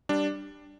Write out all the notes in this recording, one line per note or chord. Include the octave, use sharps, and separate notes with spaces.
G3 D4